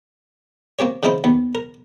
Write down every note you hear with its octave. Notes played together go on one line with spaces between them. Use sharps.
A#3 C4 G4 C#5
C#3 F3 C4 D#4 E4 C5
D#2 B3
A#4